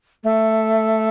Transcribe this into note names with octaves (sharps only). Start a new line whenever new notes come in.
A3